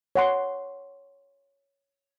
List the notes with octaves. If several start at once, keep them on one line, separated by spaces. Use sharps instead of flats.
C#5 F#5 C6